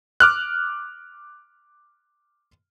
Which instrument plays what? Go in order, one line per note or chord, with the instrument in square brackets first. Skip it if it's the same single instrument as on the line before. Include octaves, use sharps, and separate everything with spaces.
[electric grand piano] D6 F6 F#6